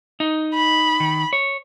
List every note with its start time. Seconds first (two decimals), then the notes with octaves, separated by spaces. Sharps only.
0.20 D#4
0.54 B5
1.00 D#3
1.33 C#5